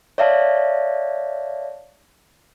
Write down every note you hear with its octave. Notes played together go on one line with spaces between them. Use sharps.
C#5 D5 E5 F5 A5